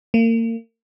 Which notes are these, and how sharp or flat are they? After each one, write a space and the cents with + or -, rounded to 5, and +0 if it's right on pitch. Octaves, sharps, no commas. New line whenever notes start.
A#3 -35